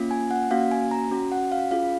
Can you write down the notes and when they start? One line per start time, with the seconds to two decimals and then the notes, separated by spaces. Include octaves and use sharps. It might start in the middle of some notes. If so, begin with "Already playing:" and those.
Already playing: A#3 C#4 F4
0.11 G#5
0.31 F#5
0.51 A#3 C#4 F#4 F5
0.71 G#5
0.91 A#5
1.11 C#4 F#4
1.32 F#5
1.52 F5
1.71 C#4 F4 G#4 F5